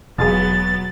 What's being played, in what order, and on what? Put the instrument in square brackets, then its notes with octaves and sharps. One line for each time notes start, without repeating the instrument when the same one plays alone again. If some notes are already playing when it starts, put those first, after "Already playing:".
[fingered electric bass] E1 [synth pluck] B2 F4 G#4 [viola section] F#3 B3 [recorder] A6